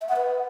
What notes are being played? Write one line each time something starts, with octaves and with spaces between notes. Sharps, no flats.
E5
F#5
B4